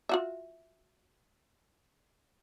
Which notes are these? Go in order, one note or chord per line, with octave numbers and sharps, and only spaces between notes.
F4 F#4 E5